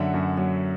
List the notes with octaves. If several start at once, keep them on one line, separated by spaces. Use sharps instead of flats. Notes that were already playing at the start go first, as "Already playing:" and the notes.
Already playing: F#2 D3 F#3 E5 F#5
F#2
F#3